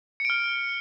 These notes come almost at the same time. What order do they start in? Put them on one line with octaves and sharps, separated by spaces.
C#7 D7 F6